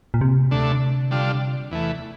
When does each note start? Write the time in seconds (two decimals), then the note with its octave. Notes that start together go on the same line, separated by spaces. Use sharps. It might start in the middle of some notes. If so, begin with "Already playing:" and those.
0.14 A#2
0.21 C3
0.51 D2 D3 A3 D4
1.11 D3 G3 D4 F4
1.71 E2 E3 A3